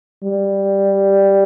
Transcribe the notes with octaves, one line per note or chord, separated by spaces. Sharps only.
G3